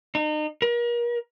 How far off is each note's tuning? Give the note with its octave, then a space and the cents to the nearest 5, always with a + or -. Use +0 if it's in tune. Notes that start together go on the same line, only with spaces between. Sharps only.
D#4 -35
A#4 +35